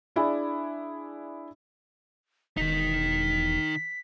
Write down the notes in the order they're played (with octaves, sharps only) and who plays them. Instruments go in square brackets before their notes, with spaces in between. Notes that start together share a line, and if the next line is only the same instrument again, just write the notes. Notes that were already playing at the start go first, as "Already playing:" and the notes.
[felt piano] D4 E4 G#4 D5
[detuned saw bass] E1 [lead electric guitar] D#3 D#4 [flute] B6